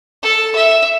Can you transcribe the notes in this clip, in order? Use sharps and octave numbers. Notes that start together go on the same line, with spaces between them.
A4
E5